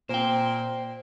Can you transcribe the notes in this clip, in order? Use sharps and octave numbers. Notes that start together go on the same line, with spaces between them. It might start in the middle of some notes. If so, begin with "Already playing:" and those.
A#2 C5 G5